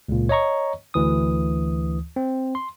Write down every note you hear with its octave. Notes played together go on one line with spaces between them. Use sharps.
C#2 A#2
C#5 D#5 A#5 C#6
D2 E3 D#6
C4
C6